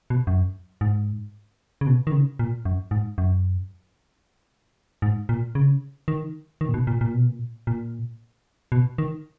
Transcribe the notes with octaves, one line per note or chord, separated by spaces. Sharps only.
B2
F#2
G#2
C#3
B2
D#3
C#3
A#2
F#2
G#2
F#2
G#2
A#2
C#3
D#3
D#3
A#2
B2
A#2
A#2
B2
A#2
A#2
B2
D#3